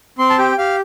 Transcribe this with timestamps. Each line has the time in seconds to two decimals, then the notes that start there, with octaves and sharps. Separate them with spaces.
0.18 C4 C6
0.30 A5
0.38 G4 G5
0.58 G4 F5